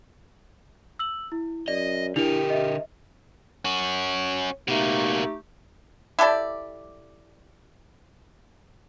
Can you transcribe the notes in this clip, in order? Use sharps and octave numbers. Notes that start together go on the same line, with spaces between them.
E6 F#7
E4
F#2 D5 D#5
D3 D4 E4 G4 A#4 F7
D#5 E5
C#4 F#4
B2 A3 A#3 D#4 G4
E4 G4 A4 D5